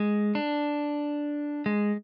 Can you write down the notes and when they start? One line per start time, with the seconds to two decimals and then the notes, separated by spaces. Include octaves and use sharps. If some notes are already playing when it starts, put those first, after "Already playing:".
Already playing: G#3
0.35 D4
1.66 G#3